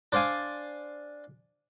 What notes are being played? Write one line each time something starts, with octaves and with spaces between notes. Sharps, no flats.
D4 C5 D5 F5 G#5